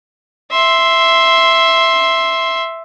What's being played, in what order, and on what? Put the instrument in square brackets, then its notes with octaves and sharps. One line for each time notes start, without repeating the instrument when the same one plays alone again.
[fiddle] E5 C6